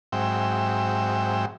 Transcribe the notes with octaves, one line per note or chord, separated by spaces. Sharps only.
G#2 F#3 C4 E5 G5